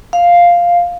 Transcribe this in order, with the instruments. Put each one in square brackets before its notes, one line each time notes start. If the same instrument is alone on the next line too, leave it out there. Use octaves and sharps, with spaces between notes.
[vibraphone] F5